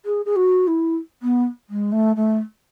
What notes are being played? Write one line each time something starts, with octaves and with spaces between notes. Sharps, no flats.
G#4
G#4
F#4
E4
B3
G#3
A3
A3